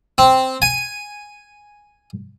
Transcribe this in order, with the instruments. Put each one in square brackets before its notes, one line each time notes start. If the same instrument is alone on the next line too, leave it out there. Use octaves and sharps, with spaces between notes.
[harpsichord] C4
G#5